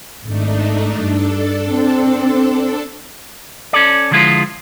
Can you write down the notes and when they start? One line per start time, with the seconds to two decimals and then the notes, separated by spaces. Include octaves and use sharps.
0.23 G#1 A3 D4 D#4
0.99 G2 D4 A4
1.73 C4
3.73 C#4 A4 D5
4.11 D3 F3 G#3 E4 F4 C5